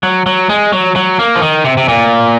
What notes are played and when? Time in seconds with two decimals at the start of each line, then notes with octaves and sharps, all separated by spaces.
0.03 F#3
0.26 F#3
0.49 G#3
0.73 F#3
0.96 F#3
1.19 A#3
1.35 F3
1.42 D#3
1.65 C3
1.77 C3
1.88 A#2